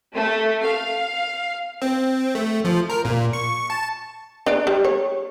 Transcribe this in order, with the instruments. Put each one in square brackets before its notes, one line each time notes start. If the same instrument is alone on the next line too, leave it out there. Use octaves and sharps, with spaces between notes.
[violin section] A3
F5
[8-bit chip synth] C4
A3
F3
A#4
A#2
C#6
A5
[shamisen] D4 D5
G3
C#5